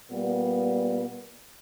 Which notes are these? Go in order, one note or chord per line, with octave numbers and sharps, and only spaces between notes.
A#2 G3 B3